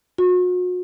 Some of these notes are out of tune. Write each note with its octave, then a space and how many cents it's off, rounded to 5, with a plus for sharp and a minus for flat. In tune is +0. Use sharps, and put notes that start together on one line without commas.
F#4 -40